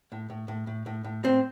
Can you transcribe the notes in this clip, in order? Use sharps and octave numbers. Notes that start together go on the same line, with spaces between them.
A2
A2
A2
A2
A2
A2
A2 C4